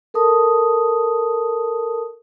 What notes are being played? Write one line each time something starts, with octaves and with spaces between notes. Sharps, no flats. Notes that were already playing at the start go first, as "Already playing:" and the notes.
A4 A#4 A5 D#6